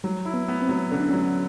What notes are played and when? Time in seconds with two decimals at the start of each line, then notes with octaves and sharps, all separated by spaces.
0.04 F#3 G3
0.25 E4
0.34 B3
0.48 B3
0.62 C4
0.69 F#3
0.91 D3 C#4
1.00 D4
1.09 F#3 C#4